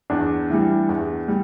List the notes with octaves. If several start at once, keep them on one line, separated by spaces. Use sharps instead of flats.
E2 D4
E3 G3
E2
G3